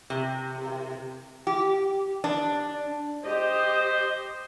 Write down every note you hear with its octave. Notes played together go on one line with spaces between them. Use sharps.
C3
G4
D4
G4 C5 D#5